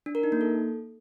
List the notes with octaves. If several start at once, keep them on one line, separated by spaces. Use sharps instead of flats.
D4
A#4
D#4
A#3
A4